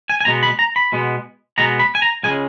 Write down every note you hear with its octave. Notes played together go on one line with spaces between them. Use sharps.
G#5
G#5
B2 G#3 B3 A#5
B5
A#5
B5
B2 G#3 B3
B2 G#3 B3 A#5
B5
G#5
A#5
C#2 C#3 G#3 G#5